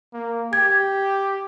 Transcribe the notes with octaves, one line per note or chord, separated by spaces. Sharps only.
A#3
G4 G#6